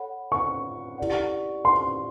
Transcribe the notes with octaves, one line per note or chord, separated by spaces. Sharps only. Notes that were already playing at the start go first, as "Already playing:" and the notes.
Already playing: A4 C#5 F#5 B5
C#6
E4 G4 A#4 D5 F#5
C6